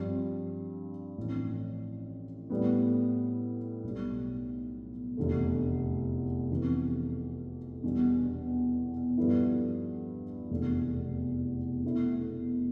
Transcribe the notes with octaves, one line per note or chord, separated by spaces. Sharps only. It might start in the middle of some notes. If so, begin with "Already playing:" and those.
Already playing: G2 F3 C4
A1 A2 F3 C4
A2 G3 B3
B1 B2 G3
F1 E2 D3 A3
F2 C3 E3 B3
E2 B2 G3 D4
G2 F3 B3 E4 A4
F1 E2 B2 A3
B2 A3 E4